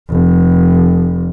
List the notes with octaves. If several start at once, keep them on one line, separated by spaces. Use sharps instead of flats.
F1